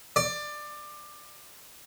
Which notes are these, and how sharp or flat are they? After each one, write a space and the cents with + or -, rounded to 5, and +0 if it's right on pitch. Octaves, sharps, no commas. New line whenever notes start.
D5 +20